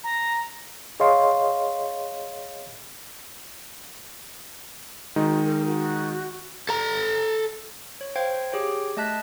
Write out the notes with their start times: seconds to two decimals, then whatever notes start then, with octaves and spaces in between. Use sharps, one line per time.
0.04 A#5
1.00 G#4 C#5 D#5 F5 C6
5.16 D#3 G#3 D#4 F#4
5.45 A#4
5.65 F#4
6.69 A4 A#5
8.01 C#5
8.16 C5 F5 G5 G#6
8.52 G4 G#4 C#5 G5
8.97 A3 D#5 A5 F#6 B6